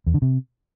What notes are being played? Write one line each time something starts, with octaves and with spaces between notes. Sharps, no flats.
E2
D3
C3